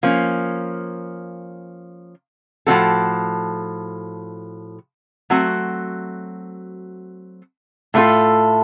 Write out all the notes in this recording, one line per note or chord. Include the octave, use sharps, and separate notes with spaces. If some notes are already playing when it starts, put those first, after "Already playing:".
F3 A#3 C#4
A2 F3 C4 F#4 A4
F#3 A3 C4 F#4
A2 A3 C4 F4 A4